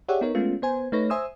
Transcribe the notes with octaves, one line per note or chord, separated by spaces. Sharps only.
G4 G#4 C#5 D5 E5 F#5
B3 D#4 A#4 C#5
G#3 A3 B3 C#4 F4
B3 C5 G#5
A3 D#4 B4 C#5 A#6
C5 E5 G#5 C6 D#6 E6